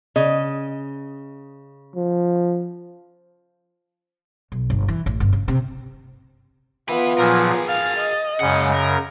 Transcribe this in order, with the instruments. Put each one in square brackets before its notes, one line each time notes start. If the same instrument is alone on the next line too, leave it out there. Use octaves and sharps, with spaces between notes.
[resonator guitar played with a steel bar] C#3 D#5
[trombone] F3
[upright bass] B1
G1
E3
A1
G1
C#3
C3
[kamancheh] B3 F4 [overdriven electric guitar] B4 E5
[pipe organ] A#2 F3 F#3 [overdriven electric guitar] G#4 A#4
[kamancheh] F5 F6 [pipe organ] A6
[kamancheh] D#5
[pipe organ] F#2 C#3 [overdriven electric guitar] G#3 F#5
[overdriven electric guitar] A#4